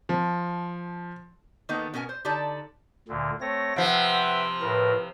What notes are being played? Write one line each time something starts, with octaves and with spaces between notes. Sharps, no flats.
F3
D#3 A#3 B3 D#4 A4
B2 C#4 A#4 G5 G#5
C5
D3 D#4 G4 A4 D5 A5
D2 A#2 D3
A3 C4 C#5 A#6
C3 F3 B4 E5 F#5 G5
A2 A#4 B4